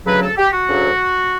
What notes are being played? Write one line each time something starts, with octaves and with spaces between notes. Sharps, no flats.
D2 C#3 F#3 B4
A4
G4
F#4
D2 C#3 F#3